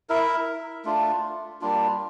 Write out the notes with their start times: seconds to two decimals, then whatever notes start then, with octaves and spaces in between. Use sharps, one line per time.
0.09 E4 A#4 E5
0.85 A3 D4 F4
1.61 G3 A#3 D4 F4